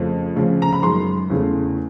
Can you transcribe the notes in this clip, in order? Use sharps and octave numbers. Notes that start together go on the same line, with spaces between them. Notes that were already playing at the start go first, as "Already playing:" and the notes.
Already playing: F2 C#3 F3 A3
D2 C#3 F3
A#5
B5
F#2 D#3 G#3 C6
E2 C#3 E3 A3